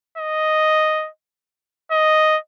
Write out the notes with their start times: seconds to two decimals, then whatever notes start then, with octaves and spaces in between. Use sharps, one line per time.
0.18 D#5
1.92 D#5